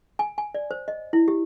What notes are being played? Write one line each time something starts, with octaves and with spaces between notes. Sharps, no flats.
G#5
G#5
D5
C5
D#5
E4
G4